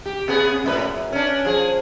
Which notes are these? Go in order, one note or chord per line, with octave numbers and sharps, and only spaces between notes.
G4
C3 B3 G#4
F#2 A2 B4
F#2
C#4 D4
F3 G#4